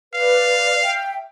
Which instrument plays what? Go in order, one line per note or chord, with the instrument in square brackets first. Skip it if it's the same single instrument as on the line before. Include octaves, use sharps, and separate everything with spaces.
[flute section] B4 D5 [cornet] F5
[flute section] E5 G5